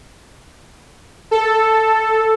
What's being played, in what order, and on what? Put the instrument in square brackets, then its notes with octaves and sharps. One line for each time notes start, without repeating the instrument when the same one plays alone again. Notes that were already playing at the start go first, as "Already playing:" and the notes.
[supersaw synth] A4